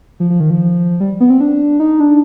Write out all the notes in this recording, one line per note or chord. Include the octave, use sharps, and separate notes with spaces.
F3
F3
D#3
F3
G3
B3
C4
D4
D#4
D4